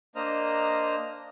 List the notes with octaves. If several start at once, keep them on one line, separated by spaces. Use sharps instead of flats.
A#3 D4 C5 D#5 A#5 F6